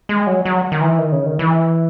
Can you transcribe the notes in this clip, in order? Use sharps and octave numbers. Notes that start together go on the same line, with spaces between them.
G#3
F#3
F#3
D#3
E3
D#3
C#3
D#3
E3